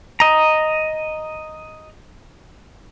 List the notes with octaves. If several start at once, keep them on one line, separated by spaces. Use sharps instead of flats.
D#5 A#5